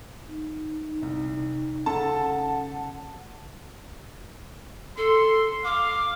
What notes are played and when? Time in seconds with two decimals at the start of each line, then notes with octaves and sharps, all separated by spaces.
0.27 D#4
1.02 C2
1.86 C#3 A4 F#5 A5
4.97 A4 C6
5.65 F5 D6